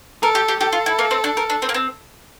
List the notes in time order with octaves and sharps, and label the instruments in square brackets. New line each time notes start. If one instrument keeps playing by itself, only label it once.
[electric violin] A4 [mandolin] A#4
[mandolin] G4
G4
[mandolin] G4 [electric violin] A4
[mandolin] F4
E4
A#3
C4
D4
A#4
D4
C4
A#3
C4